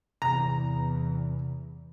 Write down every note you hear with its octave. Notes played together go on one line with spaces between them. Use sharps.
E2 C3 A#5